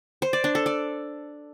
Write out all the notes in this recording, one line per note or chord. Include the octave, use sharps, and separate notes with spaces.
C5
D5
D4
A4
D5